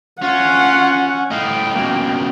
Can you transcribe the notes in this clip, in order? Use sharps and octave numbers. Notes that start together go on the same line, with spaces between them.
C#4 F4 F#5
A2 D#4 F5 G5
C#2 B2 A#3